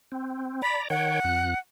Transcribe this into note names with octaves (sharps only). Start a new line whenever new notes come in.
C4
D5 A#5 B5
D#3 C#5 F#5 G5
F2 F#6